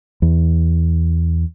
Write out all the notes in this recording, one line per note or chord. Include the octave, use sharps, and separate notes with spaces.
E2